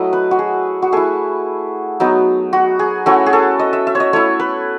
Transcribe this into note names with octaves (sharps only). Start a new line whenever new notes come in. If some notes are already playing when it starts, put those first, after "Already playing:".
Already playing: F#3 A3 E4 D#5
B4
F#4
G#4
F#4
A3 E4 G#4
F#3 B3 D#4
F#4
G#4
A3 C#4 E4 F#4
G#4
A4
D#5
E5
E5
C#5
D#5
A3 E4 C#5
B4